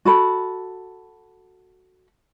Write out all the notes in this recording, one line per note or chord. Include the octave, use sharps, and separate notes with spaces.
F#4 A4 B5